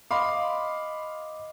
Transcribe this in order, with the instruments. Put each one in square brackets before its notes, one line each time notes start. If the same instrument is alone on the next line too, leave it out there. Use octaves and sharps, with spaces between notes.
[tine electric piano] D#5 D6 [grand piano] F5 B5 C6